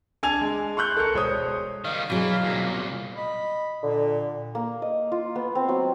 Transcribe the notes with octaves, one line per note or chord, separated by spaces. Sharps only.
D4 G#5 A5 G#6 F7
G#3
C6 C#6 F#6 G6
A4 A#4 C#7
E1 C5 C#5 D#6
D#3 G3 F5
B2 E3 F#3 G#4
C2 A#2
D#5 B5
A#2 D3
A#3
D#5
F4
B3
C4
F#3